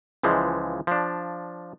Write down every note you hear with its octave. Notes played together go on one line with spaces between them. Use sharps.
C#2 E3 F3 G#3
F3 D4